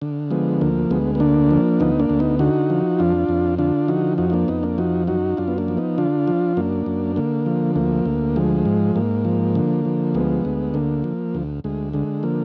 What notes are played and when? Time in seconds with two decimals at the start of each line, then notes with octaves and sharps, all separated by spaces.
0.02 D3
0.30 F3 G#3 B3
0.61 D2 A#3
0.90 D2 G#3 B3
1.15 B3
1.20 D3 A#3 D4
1.51 F3
1.80 D2 B3 D#4
1.99 A#3 D4
2.09 D2
2.19 B3 D#4
2.39 D3 D#4 F#4
2.70 F3
2.99 F2 D4 F4
3.29 F2
3.58 D3 D4 F4
3.88 F3 D#4 F#4
4.18 F2 D#4 F#4
4.30 D#4
4.33 A#3 D4
4.48 F2 B3 D#4
4.63 A#3 D4
4.78 F3 D#4 F#4
5.07 F#2 D#4 F#4
5.37 F#2 D4 F4
5.48 B3
5.58 A#3 D4
5.68 F3
5.77 B3 D#4
5.98 D3 D4 F4
6.28 F3
6.57 F#2 A#3 D4
6.86 F#2
7.16 D3 A#3
7.46 F3
7.76 D2 A#3
8.06 D2
8.36 F3 G#3
8.65 G#2
8.96 G#2 A#3
9.25 F3
9.55 D3
9.85 F3
10.14 D2 G#3 B3
10.45 D2
10.74 D3 A#3
11.04 F3
11.35 D2
11.64 D2 G#3
11.93 D3 G#3
12.23 F3 A#3